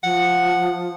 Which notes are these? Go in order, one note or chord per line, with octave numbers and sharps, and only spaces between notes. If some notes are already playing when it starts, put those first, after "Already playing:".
F3 F#5